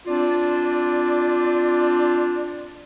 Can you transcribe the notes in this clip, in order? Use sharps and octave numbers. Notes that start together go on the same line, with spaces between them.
C4 D4 F4 D5